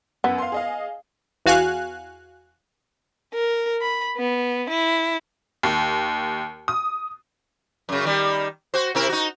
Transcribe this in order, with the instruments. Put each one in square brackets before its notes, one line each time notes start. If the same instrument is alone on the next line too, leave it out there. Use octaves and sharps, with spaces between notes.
[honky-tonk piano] F#2 [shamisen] B3
[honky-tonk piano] F5 C6
G#4 D#5 F5
[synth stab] E2 F#4 F5 G#5 F#6
[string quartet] A#4
B5
B3
E4
[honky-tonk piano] D#2
D#6
[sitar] F#2 C#3
D#3 G3
F#4 C5
C3 E4 A#4
D#4 F#4